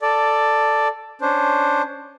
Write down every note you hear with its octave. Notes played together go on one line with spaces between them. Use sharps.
A4 D5
C#4 D4 C5